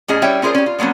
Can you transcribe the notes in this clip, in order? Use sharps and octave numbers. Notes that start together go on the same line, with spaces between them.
A2 C#4 G#4 D#5 G#5
G3 C#4 E4 C#5 E5 G5
C#4 F4 G#4 A#4 C5 D5
C#4 G4
F4
F3 F#3 A#3 B3 C#4